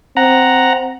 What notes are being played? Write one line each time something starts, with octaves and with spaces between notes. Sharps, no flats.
C4 F#5 A#5